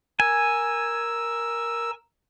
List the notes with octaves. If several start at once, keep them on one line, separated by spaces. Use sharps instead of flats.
A#4 G#5 E6